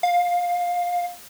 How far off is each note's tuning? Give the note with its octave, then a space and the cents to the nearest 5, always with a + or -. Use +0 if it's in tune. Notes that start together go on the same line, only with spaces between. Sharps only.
F5 +15